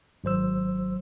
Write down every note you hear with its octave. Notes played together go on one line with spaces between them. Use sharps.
G#1 F#3 C5 E6